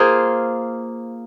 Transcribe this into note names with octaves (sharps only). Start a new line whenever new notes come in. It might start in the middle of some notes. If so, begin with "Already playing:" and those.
Already playing: A#3 F4 G#4 C5